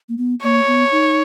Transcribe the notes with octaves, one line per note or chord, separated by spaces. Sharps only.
A#3
B3
A#3 C#5
B3
D#4